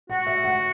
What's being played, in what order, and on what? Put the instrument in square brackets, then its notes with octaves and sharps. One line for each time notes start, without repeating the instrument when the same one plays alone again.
[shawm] F#4 [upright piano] F#5
[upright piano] E5
F#5